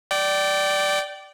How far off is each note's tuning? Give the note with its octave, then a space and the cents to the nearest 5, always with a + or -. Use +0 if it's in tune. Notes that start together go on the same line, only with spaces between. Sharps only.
D5 +0 G5 -25